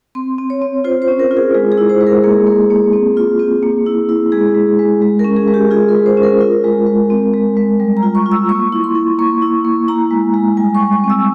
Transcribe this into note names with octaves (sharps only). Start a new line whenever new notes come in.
C4 C6
C4
C#5
C4
F4 C5
C5
C#4
A#4
F4
G#4
G#3 G#4
G#4
E4
C5
G#3
A#4
A#3 G#4
A#3
A#3
C4
F4
C4
A#3
E4
E4
G#3 G#4
G#3
G#3
G#3
A#4
C#4
G#4
G#3
G4
F4 G#4
A#4
G#3
C5
C#4
A#4
F4
G#3
G#3
C4
G#3
G#3
G3
A#5
F4
C#6
F4
E6
A#3 C#6
E4
C6
E4
A#3 C#6
E4
A#3
E4 A#5
G#3
G#3
G3 G#5
C#6
G3
C#6
C4
E6